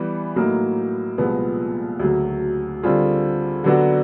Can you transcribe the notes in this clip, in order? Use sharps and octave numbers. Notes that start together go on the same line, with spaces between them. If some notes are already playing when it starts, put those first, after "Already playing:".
Already playing: E3 G3 B3
A2 F#3 A#3 D#4
C2 A#2 F3 G#3 B3
D2 C#3 F#3
D3 G3 C4 F4 G#4
D3 F#3 B3 D4 F#4